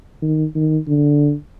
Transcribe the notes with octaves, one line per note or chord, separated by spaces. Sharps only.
D#3
D#3
D3